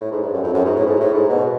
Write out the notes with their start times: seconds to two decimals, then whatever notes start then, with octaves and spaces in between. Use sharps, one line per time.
0.01 A2
0.12 G#2
0.22 G2
0.33 F#2
0.44 F2
0.54 F#2
0.65 G#2
0.76 A2
0.86 G#2
1.01 A2
1.14 G#2
1.29 B2